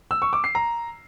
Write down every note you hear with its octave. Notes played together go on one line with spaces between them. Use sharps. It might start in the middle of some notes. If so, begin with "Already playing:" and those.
E6
C#6
D6
C7
A#5